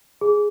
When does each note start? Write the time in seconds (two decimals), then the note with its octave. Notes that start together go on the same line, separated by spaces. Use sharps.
0.21 G#4